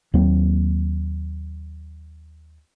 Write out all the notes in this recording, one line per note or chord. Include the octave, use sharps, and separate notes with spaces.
D#2 F#3 A#3 C4